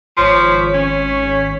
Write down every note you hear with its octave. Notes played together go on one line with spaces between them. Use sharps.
G#1 F3 C#5 B6
C#4